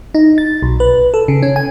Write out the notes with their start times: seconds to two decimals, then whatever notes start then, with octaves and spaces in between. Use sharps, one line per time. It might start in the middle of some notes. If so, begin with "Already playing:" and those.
0.14 D#4
0.38 A6
0.62 B1
0.80 B4
1.14 A4
1.28 C#3
1.43 C#4
1.56 G#5